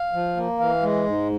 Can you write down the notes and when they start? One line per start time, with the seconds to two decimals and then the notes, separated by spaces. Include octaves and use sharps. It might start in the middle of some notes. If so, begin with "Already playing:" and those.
Already playing: F5
0.13 F3
0.37 A#3
0.60 E3 F5
0.83 G#3
1.06 G#2